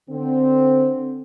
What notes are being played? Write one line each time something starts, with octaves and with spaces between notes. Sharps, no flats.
D3 C4